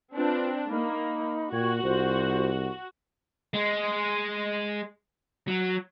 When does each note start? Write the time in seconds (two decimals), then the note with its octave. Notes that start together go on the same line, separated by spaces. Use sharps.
0.16 C4 D4 F4 B4
0.70 A#3 D#4 B5
1.52 A#2 F#4 G5 C#6 G#6
1.84 C2 F4 C5
3.54 G#3
5.48 F#3